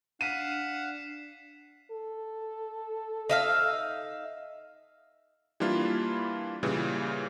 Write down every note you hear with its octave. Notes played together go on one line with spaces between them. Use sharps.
D4 F5 F#5 B6 C7 D#7 E7
A4
D#4 E5 F5
E3 G3 A#3 D4 E4 F4
A#2 C#3 E3 G3